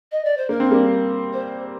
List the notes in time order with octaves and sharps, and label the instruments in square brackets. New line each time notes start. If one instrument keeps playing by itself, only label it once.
[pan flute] D#5
D5
C5
[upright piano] A#3 [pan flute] A#4
[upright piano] C4
G3 A#3
[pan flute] C5